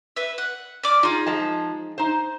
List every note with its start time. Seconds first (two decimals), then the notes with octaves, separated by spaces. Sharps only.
0.16 B4 E5
0.38 F#5
0.84 D5 D6 F6
1.03 D#4 F4 G#4
1.27 F3 G#3 A5
1.98 D#4 C5